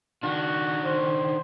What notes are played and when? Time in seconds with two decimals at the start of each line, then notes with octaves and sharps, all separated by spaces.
0.23 D#3 D4 F#4
0.85 C5